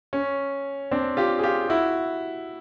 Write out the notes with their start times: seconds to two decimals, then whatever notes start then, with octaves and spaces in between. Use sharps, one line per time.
0.13 C#4
0.91 C4 D4
1.17 F4 G4
1.39 G#4
1.43 F4 G4
1.69 E4 F#4